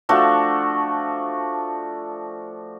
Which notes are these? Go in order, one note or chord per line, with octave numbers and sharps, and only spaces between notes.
F3 A3 D4 F#4